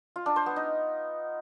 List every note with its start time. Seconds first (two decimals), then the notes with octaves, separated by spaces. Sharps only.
0.16 F4
0.26 D4
0.36 C5
0.46 B3
0.56 D#4